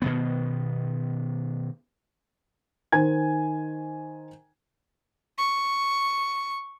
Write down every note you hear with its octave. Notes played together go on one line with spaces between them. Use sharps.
B2 D#3 B3
D#3 C5 G#5 G#6
C#6